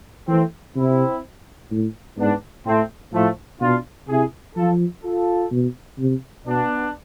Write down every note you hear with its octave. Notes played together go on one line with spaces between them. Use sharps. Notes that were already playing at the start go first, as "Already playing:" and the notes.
E3 A3 C4
C3 C4 E4
A2
G#2 B3 D4
A2 A3 C4
A2 F3 A3
B2 D4 F4
C3 E4 G#4
F3 F4 A4
F4 A4
B2
C3
B2 B3 D4